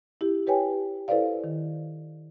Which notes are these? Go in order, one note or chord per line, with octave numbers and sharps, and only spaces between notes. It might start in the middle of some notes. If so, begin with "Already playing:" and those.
E4 G4
G4 B4 C#5 G5 G#5
E4 A4 B4 C5 D5 F5
D#3